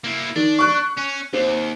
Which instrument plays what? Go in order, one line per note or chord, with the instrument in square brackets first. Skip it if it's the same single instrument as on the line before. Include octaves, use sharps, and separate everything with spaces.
[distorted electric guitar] A#3 E4
[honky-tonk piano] D#3 [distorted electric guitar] D4
[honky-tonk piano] C#6 F#6
[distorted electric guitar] C#4
[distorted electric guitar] D#2 [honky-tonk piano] C4